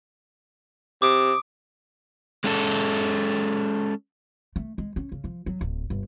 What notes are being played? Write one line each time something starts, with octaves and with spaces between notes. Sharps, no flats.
C3 D6 D#6 D7
G#3 C#4 A4
A3
G#3
C#4
C#3
F3
F#3
D1
G1